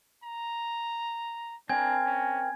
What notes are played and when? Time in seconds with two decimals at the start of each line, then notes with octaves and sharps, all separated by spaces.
0.24 A#5
1.69 C4 D4 A#4 G#5 G#6
2.05 C#4